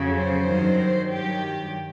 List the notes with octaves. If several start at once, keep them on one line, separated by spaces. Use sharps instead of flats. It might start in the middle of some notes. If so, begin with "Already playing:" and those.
Already playing: F2 C#3 F#3
C5
G2 D#3 F#3
G2 D#3 F#3 G4